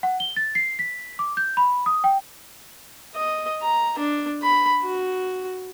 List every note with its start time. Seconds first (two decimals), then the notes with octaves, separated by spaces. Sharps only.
0.03 F#5
0.20 G7
0.36 A6
0.55 C7
0.79 B6
1.19 D6
1.37 G6
1.57 B5
1.86 D#6
2.04 G5
3.15 D#5
3.62 A#5
3.99 D4
4.43 B5
4.83 F#4